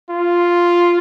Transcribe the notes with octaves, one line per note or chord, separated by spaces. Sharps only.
F4